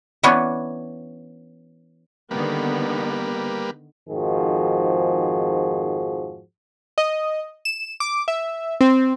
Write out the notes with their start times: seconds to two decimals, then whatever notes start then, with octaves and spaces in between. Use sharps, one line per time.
0.23 E3 B3 C#4 D4
2.31 D3 D#3 G3 A#3 B3 B4
4.09 F2 G#2 D#3 F3 F#4 G#4
6.98 D#5
7.65 E7
8.00 D6
8.28 E5
8.81 C4